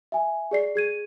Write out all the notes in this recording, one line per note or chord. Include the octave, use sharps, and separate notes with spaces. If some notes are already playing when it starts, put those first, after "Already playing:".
E5 G#5
G#4 D5 C7
G#4 G#6 D#7